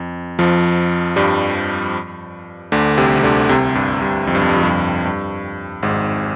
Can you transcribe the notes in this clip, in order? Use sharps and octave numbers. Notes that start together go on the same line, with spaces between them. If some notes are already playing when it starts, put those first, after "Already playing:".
Already playing: F2
F2 F3
G2 G3
D2 D3
C2 C3
C3
D2 D3
C2 C3
G2
G2
F2
G2
F2
G2
F2
G2
F2
G2
G#1 G#2